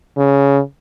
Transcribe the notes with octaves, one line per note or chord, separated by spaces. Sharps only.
C#3